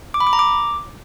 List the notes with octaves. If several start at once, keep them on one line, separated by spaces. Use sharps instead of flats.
D6
B5
D6
A#5
D6